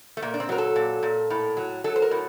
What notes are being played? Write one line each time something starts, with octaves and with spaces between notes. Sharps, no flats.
A3
A#2 A#3
D4
C4
F#3 A#4
A4
A#2
A#2
A2
F#3
F#3 A4
C5
A#4
A2